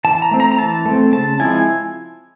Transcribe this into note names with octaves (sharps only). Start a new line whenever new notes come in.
E3 A5
A#5
A3 C4
A#5
A#5
E3 A5
A3 C4
C#3 A5
F3 G#3 C4 E4 G#5